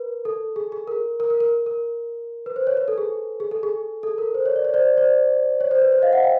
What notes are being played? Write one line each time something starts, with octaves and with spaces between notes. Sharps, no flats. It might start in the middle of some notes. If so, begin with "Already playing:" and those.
Already playing: A#4 B4
A4
G#4
G#4
A#4
A#4
A#4
A#4
A#4
B4
C5
C#5
B4
A4
G#4
G#4
A4
G#4
A4
A#4
C5
C#5
D5
C#5
C5 D5
C5 D5
C#5
C5
B4
C5
D#5 F5
E5 F#5
F5 G5